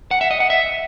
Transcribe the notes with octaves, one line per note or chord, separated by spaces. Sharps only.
F#5
E5
D#5
F#5
E5